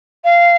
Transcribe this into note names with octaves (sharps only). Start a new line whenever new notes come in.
F5